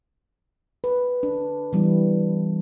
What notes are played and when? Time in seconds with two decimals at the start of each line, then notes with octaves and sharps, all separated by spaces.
0.84 B4
1.23 D4
1.73 E3 G3 B3 E4